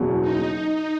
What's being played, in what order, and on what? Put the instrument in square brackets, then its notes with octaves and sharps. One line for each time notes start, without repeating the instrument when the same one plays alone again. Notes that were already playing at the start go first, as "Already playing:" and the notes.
Already playing: [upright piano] F#1 E2 B2 F#3
[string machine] D#4